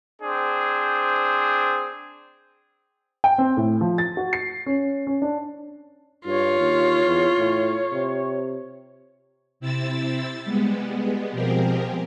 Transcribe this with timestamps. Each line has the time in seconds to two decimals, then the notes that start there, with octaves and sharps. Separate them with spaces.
0.20 C4 D4 G#4 C5
3.24 G5
3.38 C4
3.57 A2
3.81 F3
3.98 A6
4.17 F#4
4.33 C7
4.66 C#4
5.07 C#4
5.22 D4
6.26 G2 F4 C#5
6.59 D#2
7.06 E2
7.38 A2
7.92 C3
9.60 C3 C4 E4 E6 A6
10.45 G3 G#3 B3
11.32 B2 F3 C4 G4 G#4 A#4